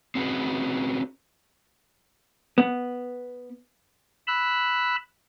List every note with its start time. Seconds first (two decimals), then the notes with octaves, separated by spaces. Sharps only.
0.15 C4 C#4 F#4 G#4 B4
2.58 B3
4.27 B5 E6 F#6